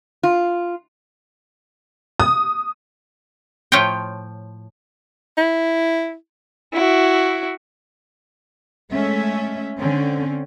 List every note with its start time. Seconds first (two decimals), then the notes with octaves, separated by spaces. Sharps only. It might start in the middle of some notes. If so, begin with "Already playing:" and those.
0.23 F4
2.20 D#6
3.72 A2 F3 A3 F4 C#5 G5
5.37 E4
6.73 E4 F#4
8.92 G#3 A3 C#4 E5
9.78 D3 C4 C#4